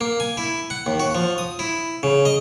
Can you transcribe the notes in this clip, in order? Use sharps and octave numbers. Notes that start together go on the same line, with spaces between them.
A#3
G#5
E4
F#5
D#2
F#4
F3
D#6
E4
C#3
D#5